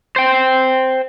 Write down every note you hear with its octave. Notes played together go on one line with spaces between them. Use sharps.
C5 G5